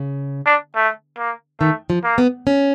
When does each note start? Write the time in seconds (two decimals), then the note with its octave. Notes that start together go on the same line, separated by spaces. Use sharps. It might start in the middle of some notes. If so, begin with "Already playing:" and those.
Already playing: C#3
0.46 D4
0.75 A3
1.17 A#3
1.60 D#3 A3
1.90 F3
2.04 A#3
2.18 B3
2.47 C#4